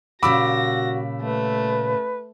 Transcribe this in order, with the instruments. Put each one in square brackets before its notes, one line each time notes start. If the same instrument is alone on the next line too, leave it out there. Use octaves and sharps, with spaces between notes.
[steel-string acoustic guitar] A#2 C#3 G3 [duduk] F#4 [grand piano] B5 D6 E6 [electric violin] A#6
[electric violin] A3 [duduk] B4